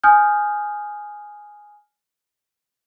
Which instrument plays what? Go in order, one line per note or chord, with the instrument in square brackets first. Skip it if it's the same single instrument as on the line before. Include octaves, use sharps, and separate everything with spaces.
[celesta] G#5 D#6 F6 G6